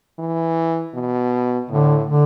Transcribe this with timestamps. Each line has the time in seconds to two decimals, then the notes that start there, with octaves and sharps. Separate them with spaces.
0.19 E3
0.94 B2
1.70 A2 D3
2.07 D3